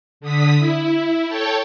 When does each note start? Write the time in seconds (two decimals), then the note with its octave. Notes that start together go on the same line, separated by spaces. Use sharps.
0.21 D3 D#6 B6
0.59 E4
1.28 A4 C#5 G5 A5